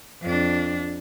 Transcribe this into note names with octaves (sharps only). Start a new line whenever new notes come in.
F2 D4